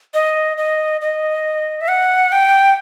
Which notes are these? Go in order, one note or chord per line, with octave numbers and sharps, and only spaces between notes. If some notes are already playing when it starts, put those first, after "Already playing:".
D#5
D#5
D#5
E5
F#5
G5